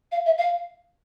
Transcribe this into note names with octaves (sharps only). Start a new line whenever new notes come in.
F5
E5
F5